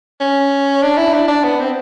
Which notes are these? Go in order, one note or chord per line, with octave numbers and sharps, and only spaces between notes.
C#4
D4
E4
D4
D4
B3
C4